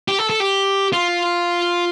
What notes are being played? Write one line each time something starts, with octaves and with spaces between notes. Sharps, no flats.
G4
A4
A4
G4
F4